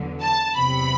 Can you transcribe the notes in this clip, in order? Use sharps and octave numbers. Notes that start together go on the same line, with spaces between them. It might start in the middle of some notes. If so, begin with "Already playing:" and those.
Already playing: E2 D3 F#3
A5
E2 C3 F#3 B5